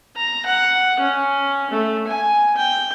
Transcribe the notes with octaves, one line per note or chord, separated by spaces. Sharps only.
A#5
F#5
C#4
A3
G#5
G5